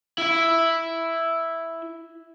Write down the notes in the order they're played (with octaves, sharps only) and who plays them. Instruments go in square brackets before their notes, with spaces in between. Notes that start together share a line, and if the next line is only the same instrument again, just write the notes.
[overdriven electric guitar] E4 E5